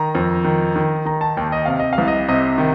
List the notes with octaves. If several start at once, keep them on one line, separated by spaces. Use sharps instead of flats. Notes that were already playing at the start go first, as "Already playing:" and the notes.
Already playing: D#3 A#5
F2
D#3
D#3
D#3 A#5
A5
D#2 G5
D#5
C3 F5
D#5
F5
C2
D#5
C3 D#5
D#3